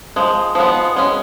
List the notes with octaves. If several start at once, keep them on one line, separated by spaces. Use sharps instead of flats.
F3 G#3
F3 G#3 B3
G#3 C#4